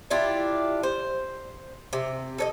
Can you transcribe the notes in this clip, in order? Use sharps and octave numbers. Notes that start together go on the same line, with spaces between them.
D4 E4 F4 G4
C5
C3
A4 C#5 D#5